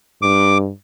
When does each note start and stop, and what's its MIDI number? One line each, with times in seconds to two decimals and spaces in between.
0.22 0.70 43
0.22 0.58 86